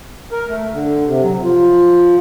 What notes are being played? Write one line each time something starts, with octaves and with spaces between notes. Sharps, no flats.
A#4
A3
D3
C3
F#3
F3